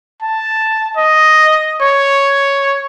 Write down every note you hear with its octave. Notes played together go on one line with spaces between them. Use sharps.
A5
D#5
C#5